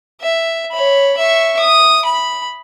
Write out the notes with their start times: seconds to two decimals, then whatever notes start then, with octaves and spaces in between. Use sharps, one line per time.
0.21 E5
0.71 C#5 B5
1.17 E5 C#6
1.59 D#6
2.05 B5